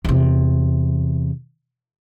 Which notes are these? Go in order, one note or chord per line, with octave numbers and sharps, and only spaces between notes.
E2 C3